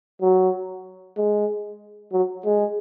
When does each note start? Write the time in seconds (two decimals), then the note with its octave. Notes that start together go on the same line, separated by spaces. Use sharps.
0.21 F#3
1.17 G#3
2.13 F#3
2.45 G#3